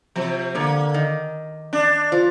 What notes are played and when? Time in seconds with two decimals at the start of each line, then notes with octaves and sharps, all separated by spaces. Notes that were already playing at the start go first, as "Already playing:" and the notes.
0.16 C3 F3
0.55 D3 A#3
0.94 D#3
1.73 D4
2.12 F3